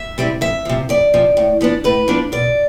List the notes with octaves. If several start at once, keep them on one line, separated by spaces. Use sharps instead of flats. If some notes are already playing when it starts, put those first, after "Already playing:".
Already playing: E5
C3 G3 C4 E4
F2 E5
C3 F3
F2 D5
C3 F3
A2
F3 B3 D4
A2 B4
F3 B3 D4
B2 D5